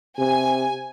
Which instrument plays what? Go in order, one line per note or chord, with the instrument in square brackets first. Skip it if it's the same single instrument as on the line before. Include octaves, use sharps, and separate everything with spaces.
[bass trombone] C3 [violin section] G#5